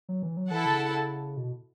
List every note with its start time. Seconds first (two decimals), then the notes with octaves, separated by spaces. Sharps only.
0.09 F#3
0.22 E3
0.37 F#3
0.50 E3 E4 A4 F#5 A5
0.66 C#3
1.37 B2